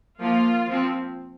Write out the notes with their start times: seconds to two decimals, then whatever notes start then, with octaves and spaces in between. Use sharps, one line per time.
0.20 F3 A#3 F4
0.68 F3 C4